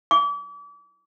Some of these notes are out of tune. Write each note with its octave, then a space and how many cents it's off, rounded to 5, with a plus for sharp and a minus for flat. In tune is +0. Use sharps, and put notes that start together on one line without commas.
D6 -35